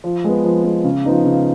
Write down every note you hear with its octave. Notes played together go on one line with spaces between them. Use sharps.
F3
G#3 B3
F3
G#3 B3
C#3
F3 B3 D#4
C#3